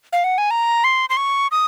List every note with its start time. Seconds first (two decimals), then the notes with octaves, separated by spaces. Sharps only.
0.13 F5
0.24 F#5
0.38 G#5
0.51 A#5
0.84 C6
1.10 C6
1.17 C#6
1.51 D#6